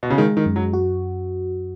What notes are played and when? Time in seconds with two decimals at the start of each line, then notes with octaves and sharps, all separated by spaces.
0.03 B2
0.10 C#3
0.18 D#3 G#3
0.37 D#3
0.46 F#2
0.56 F#3
0.73 F#4